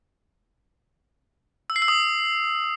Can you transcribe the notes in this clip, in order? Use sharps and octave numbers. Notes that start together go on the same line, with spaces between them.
E6
C7
E6
D#6